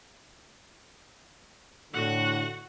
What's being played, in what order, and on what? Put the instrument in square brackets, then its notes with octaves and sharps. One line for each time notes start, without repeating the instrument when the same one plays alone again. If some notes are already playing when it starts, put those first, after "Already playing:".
[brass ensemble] A2 D3 [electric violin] F#4 F#5